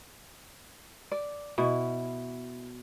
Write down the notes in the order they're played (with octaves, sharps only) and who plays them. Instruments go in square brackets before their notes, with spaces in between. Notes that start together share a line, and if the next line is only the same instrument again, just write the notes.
[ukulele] D5
[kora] B2 [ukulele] E4